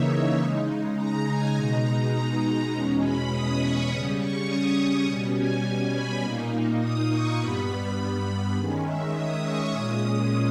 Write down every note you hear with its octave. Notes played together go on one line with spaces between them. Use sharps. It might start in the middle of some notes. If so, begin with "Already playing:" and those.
Already playing: C#3 E3 A#3 D#4 C#5 E5
C#3 G#3 D#4
A#5
G#5
B2 G#3 D#4 A#5
E2 B2 G#3 C#4 A#5
B5
D#6
C#6
C#3 G3 C#4 D#6
C#6
D#6
C#6
B2 G3 C#4
G#5
G#5
B5
A#2 A#3 D#4
D#6
C#6
G2 G3 B3 B5
D#3 G#3 C#4
E5
D#6
C#6
A#2 G#3 C#4 D#6